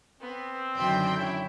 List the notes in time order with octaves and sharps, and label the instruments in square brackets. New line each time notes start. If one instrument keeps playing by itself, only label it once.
[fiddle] B3 [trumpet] C4
[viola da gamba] F#2 D#3 D4 [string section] D3 G5 [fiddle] B5 C6
[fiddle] C#4 [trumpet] E4